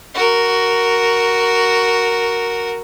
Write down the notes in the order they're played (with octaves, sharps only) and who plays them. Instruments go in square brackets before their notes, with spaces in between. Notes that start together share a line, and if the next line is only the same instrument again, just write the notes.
[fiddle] F#4 A#4